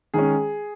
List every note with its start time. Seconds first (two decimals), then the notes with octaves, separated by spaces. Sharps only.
0.14 D#3 G#3 C#4 G#4